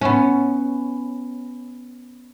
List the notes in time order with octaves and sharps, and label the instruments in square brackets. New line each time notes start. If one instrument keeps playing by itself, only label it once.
[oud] B3 C#4